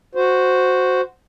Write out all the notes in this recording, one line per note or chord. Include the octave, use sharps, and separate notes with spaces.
F#4 C5